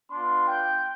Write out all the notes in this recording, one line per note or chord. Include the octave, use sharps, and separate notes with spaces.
B3 D4 F4 C6
G5